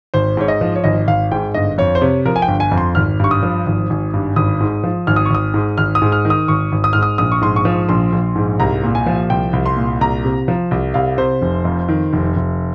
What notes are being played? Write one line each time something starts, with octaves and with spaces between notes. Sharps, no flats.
G#1 C5
G#2 C#5
D#5
F3
C#5
G#1 D#5
G#1 F5
G#2 G5
G1 D#5
F2 C#5
C5
C3 C#5
F3 A#4
G#5
G5
G1
G#5
F2
C6
G#1 F6
G2 C#6
D#6
F3
G#1
G#1
G2
G#1 D#6
G#2
F3
G#1 F6
D#6
C#6
G#1 D#6
G#2
G#1 F6
D#6
G#2
F6
D#3
D#6
G#1 C#6
G#1
D#6
G#2 F6
D#6
A#1 D#6
C#6
G#2 C6
C#6
F3
A#1 C6
A#1
G#2
C2 A#5
A#2
G#5
F3
C2 G5
C2
C6
A#2
C2 A#5
C3
F3
C2
C2 F5
C3 C5
F1
F2
D#3
F1
F1